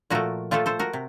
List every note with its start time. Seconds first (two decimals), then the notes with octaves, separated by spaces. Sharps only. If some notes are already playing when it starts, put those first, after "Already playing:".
0.10 A#2 F3 A3 F#4 A#4
0.51 A#2 F3 A3 F4 A4
0.66 A4 C5
0.79 F#4 A#4
0.93 C3